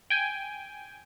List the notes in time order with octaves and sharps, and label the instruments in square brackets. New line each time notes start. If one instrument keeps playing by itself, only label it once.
[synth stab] G5 G#5